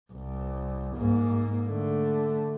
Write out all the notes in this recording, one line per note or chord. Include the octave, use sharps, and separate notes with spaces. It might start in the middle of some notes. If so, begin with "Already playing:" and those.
C2
G#2 A#3
D3 A3